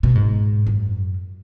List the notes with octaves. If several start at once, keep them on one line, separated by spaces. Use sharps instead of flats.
B2
G#2
F#2